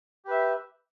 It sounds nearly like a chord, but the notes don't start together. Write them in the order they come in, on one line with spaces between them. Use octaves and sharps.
G4 B4 E5